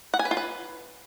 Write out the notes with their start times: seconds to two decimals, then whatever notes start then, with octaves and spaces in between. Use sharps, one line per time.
0.14 F#5
0.19 G#5
0.25 B4
0.31 F4
0.37 B4